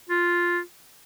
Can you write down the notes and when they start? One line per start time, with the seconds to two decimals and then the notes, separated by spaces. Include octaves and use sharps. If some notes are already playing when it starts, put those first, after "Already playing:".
0.09 F4